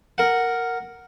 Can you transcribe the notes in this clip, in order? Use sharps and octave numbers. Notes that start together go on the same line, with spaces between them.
A#4 F#5